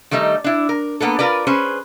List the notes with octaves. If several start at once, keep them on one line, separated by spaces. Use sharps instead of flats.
D#3 G3 A3 D#4
D4 E4
A#4
A#3 B3 D4 A4
F4 A#4 B4 D5
C#4 G#4 B4 C5